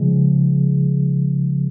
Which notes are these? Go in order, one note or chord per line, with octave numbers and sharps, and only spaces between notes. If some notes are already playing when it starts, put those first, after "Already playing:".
Already playing: C#3 F3 G#3